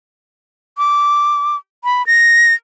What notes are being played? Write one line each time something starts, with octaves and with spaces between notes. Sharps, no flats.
D6
B5
A#6